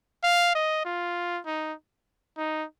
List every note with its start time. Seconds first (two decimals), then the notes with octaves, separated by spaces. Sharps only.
0.23 F5
0.55 D#5
0.85 F4
1.46 D#4
2.37 D#4